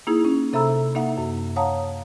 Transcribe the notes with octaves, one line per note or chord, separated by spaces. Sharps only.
A#3 D#4 E4 G#4
C#4
C3 A4 E5 A#5 B5 E6
A#3 D#4 E5 F#5
F#2
C#5 F5 F#5 A5 A#5 D#6